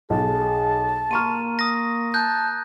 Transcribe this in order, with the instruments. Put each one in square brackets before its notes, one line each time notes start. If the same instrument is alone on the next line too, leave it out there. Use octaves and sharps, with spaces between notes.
[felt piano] B1 [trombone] G#4 [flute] A5
[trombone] A#3 [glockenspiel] A#5 D#7 [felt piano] C6 C#6 F6
[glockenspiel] D#6 A#6
[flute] A5 [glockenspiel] F#6 G6